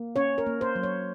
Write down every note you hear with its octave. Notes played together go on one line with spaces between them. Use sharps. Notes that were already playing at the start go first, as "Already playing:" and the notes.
Already playing: A#3
C#4 C#5
A#4
A#3
C5
F#3
C#5